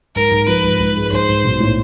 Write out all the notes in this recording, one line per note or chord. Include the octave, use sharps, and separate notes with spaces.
G#2 A#4
G#2
F3 B4
G#2
G#2
G#3
G#2 C5
G#2
B1
A2